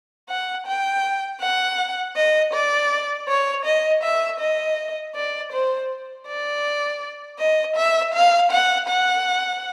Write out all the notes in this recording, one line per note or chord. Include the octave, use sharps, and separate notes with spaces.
F#5
G5
F#5
D#5
D5
C#5
D#5
E5
D#5
D5
C5
D5
D#5
E5
F5
F#5
F#5